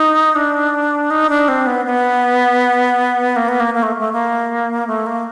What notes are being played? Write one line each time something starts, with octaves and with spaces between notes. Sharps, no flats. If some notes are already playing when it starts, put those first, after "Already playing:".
Already playing: D#4
D4
D#4
D4
C4
B3
B3
A#3
B3
A#3
A#3
A3
A3
A#3
A3
A#3